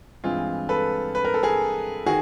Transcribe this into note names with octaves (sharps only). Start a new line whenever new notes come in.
G2 E3 G#3 C4 F4
A4 B4
B4
A#4
A4
G#4 A#4
D#3 F#4 G#4